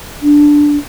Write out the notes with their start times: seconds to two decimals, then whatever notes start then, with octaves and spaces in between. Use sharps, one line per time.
0.23 D4